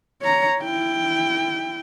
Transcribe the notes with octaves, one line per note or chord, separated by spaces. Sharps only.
C#5 A#5
E4 G5